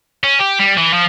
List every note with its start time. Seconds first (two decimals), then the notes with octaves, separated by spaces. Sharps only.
0.24 C#4
0.40 G4
0.60 G3
0.78 E3
0.93 F3